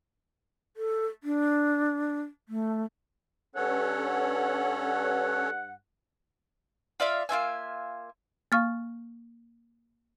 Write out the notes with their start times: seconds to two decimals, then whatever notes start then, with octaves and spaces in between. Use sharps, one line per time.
0.77 A4
1.23 D4
2.49 A3
3.55 G2 C#4 A4 C#5 F#5
7.00 F4 D5 E5 F5
7.29 A#3 F4 E5 G#5
8.52 A#3 F5 C#6 F6 A6